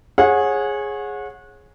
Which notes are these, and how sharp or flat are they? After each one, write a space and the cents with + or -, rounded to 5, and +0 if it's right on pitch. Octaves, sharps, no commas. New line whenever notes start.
G#4 +0 C#5 -25 F#5 -25